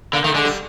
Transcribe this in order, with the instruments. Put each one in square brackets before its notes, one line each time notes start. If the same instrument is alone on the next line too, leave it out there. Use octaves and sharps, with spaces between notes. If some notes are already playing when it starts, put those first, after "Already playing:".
[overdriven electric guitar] D3 [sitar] A#3
[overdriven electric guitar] D#3 [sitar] A3
[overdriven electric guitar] D3 [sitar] G#3
[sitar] G3